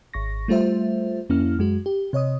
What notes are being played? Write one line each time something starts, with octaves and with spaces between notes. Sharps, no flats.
G#1 C#6 A#6
G3 A3 F4 C5 E5
F2 A#3 C#4 E4 F6
F#2 G#3 F#4
G4
C3 C#5 D#5 D#6